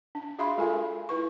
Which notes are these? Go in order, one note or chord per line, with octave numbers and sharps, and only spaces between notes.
D4
F#4 G#4 E5 F5 B5 C6
G#3 F4 A4 A#4 F5 G#5
E4 B4 C#6